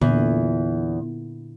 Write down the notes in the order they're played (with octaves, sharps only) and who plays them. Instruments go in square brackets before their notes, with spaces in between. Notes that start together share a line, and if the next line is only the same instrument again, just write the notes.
[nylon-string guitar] E2 [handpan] A#2 D3